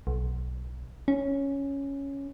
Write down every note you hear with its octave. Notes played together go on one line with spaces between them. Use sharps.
B1
C#4